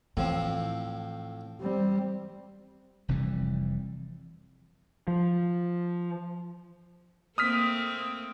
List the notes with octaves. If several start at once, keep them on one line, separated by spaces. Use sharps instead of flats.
A2 E3 F3 C4
G3 C4
F1 C3 E3 G3
F3
A3 A#3 C4 D#6 F6 B6